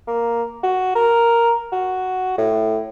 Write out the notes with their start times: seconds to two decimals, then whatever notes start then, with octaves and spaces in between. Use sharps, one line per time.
0.07 A#3
0.63 F#4
0.96 A#4
1.73 F#4
2.38 A2